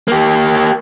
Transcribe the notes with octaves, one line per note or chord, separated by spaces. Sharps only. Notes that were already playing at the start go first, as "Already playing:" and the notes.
A#3 G4